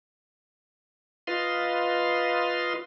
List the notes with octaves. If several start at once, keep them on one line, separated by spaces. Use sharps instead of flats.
F4 B4 D#5 F5 C6